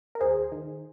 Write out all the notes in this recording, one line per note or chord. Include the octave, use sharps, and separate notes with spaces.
A#4
D#2 G#4 C5
D#3